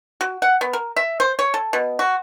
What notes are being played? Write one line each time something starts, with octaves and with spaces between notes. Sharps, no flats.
F#4
F#5
B3
A#4
E5
C5
C#5
A4
B2
F#4